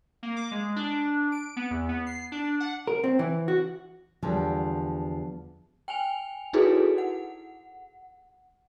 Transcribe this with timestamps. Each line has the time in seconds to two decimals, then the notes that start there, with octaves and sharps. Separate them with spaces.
0.23 A#3
0.36 D6
0.51 G#3
0.76 D4
1.32 D7
1.56 B3
1.71 E2
1.89 B3
2.07 C7
2.32 D4
2.60 F#5
2.87 A#4
3.04 C4
3.19 E3
3.48 F#4
4.23 E2 D3 F3 G3
5.88 G5 G#5 F7
6.53 D#4 E4 F#4 G#4 A4 B4
6.98 F#5